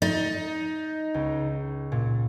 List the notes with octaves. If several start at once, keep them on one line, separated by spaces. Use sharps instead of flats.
D#4 A6
C#2
A#2